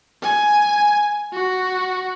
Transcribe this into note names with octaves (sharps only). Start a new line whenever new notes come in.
G#5
F#4